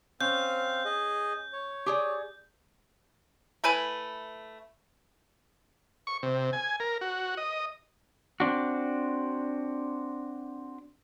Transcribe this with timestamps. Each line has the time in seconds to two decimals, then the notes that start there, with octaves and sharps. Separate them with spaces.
0.21 C4 C#4 F5 G6
0.85 G#4 D#5
1.53 C#5
1.86 G4 G#4 D5
3.64 A3 E4 B4 G#5
6.07 C#6
6.23 C3
6.53 G#5
6.80 A#4
7.01 F#4
7.37 D#5
8.40 C4 D4 F#4